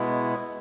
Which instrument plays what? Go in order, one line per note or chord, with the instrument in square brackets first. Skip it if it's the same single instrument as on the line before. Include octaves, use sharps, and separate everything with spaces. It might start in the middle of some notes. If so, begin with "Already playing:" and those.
Already playing: [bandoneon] B2 G#3 B3 E4